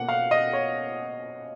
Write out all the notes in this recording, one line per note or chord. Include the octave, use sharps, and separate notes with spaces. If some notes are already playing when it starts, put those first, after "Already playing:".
Already playing: B2 A#3 F#5
F5
D#5
C#5